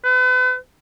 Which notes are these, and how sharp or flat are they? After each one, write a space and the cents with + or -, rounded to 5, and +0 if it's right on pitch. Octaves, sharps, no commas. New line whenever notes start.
B4 +40